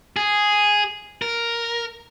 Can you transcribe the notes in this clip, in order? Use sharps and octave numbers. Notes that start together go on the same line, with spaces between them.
G#4
A#4